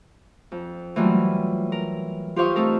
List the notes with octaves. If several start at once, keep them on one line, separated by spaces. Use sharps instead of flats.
F2
E3 F#3 G3 A3 A#3 F4
A#4
F4 G4 C5 F5 C#6 D#6
A3 C4 D#4 A4 A#4